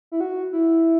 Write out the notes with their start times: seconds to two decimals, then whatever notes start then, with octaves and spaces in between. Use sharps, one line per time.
0.12 E4
0.21 F#4
0.53 E4